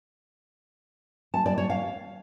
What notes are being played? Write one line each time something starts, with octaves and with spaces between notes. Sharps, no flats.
A5
D5
C#5
F5